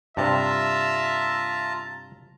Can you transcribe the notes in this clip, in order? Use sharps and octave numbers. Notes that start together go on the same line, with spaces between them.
G2 C3 F4 E5 A5 A#5